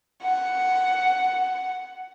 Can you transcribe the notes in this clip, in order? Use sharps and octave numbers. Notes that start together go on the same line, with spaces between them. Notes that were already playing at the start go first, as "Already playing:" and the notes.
F#5